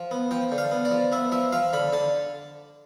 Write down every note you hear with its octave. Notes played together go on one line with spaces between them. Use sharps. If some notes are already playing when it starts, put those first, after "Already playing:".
Already playing: F3
B3
F3 G5
D3
F5
B3
D5
F3
B3 E5
F3 E5
F3 F5
D3 B5
D3 A5